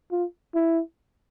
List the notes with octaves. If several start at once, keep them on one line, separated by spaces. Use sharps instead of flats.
F4
E4